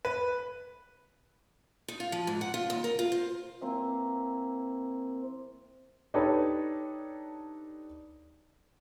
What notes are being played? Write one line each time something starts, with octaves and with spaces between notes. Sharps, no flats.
B4
D#4
F4
F3
G#2
F#5
F4
D#2
A#4
F4
C5
E3 A#3 C4 E5
D4 D#4 G4 A4 B4 C#5